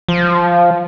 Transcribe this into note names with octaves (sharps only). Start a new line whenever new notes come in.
F3